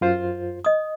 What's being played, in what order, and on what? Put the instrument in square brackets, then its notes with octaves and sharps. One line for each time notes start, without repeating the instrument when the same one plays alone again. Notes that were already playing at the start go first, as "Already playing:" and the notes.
[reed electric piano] F#2 F4 C5
[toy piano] D#5 D#6